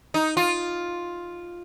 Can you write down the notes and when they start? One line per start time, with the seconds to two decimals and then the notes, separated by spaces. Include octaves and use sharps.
0.14 D#4
0.37 F4